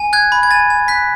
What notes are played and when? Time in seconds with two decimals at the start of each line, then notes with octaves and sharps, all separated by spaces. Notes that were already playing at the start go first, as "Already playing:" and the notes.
Already playing: G#5
0.13 F#6 G#6
0.32 B5
0.43 G#6
0.51 G#5 A6
0.70 G#5
0.88 F#6 B6